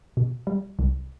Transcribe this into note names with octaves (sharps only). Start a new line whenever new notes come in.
B2
G3
C2